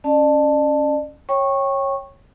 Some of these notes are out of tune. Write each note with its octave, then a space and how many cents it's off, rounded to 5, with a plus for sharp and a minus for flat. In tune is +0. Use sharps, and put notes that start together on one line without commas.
C#4 +0 D5 +40 A5 +0
C#5 -15 G5 +0 C#6 -15